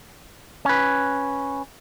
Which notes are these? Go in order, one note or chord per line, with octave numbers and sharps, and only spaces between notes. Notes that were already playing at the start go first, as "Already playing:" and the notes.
C#4 B4